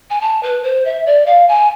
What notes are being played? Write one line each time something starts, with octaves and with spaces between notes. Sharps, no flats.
G#5
A5
B4
C5
E5
D5
F5
G#5